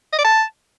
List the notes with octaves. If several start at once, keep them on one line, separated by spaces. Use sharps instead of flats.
D#5
D5
A5